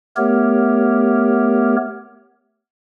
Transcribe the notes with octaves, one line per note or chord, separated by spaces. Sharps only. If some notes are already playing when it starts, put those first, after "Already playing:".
A3 B3 G4 A#4 C#5